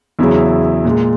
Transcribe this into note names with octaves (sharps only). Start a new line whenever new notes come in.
E2 C#3 F#3 E4 E5
A#2 G#3